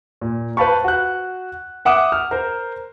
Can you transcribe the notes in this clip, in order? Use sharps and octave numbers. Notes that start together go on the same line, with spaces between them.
A#2
B4 C5 F5 A5 B5 C#6
F#4 F#6
E5 F#5 D6 D#6 E7
F6
A#4 C5